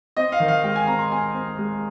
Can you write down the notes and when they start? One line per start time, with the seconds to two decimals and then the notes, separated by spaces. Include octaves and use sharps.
0.17 C4 D#5
0.32 F5
0.40 D#3
0.48 F5
0.63 G#3 G5
0.76 G#5
0.87 C4 A#5
0.99 C6
1.11 C4 G#5
1.34 C4
1.58 G#3